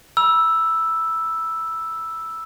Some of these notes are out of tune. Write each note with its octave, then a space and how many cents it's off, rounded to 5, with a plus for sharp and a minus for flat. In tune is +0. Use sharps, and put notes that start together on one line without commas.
B5 -35 E6 +0